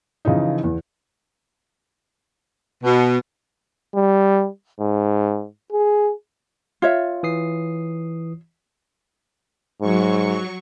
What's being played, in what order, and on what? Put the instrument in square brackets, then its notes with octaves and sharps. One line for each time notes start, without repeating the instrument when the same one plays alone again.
[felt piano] C#3 E3 F3 D#4
E2
[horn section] B2
[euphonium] G3
G#2
G#4
[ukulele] F4 C#5 E5
[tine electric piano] E3 D#6 C7
[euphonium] G#2 [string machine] F#3 C#6